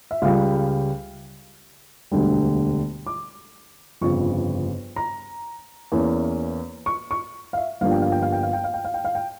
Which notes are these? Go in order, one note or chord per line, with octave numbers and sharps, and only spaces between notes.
E5
C#2 C#3 G3 F5
E1 D2 D3 G3
D6
G1 F2 C#3 C#6
A#5
E2 E3 A#3 C#4
C#6
C#6
F5
E5
G1 G2 F3 A#3 D4 F5
G5
F5
G5
F5
G5
F5
G5
F5
G5
F5
G5
F5
G5